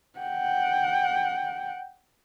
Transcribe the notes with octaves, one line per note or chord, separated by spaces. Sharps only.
F#5 G5